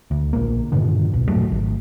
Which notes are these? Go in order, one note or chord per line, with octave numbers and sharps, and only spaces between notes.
D2
A#1 A#3
G2 A#2 D3 D#3
D1 B1
F2 G#2 F#3 A3
G#1